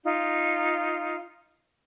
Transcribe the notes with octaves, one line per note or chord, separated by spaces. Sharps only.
D#4 F4